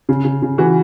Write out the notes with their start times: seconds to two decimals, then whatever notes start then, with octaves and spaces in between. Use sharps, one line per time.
0.09 C#3
0.25 C#3
0.42 C#3
0.58 E3 F#4